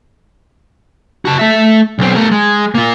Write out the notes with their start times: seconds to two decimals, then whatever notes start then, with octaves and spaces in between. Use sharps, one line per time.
1.25 F#4 A5
1.39 A3 E5
1.99 B1 C4
2.15 A3 A#4
2.31 G#3
2.75 A#3 F4